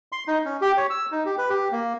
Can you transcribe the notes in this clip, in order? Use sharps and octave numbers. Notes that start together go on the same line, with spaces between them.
C6
D#4
C#4
G4
C#5
E6
D#4
G4
B4
G4
A#3